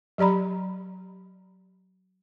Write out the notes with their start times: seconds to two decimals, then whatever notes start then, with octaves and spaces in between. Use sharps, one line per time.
0.18 F#3 G4 D5 A#5 B5